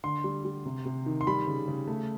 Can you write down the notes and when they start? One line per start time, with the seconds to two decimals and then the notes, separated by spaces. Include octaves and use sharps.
0.04 D3 C6
0.24 G3
0.45 G3
0.66 C3
0.85 C3
1.06 D#3
1.21 C6
1.27 G3 B5
1.47 C#3
1.68 C#3
1.88 A3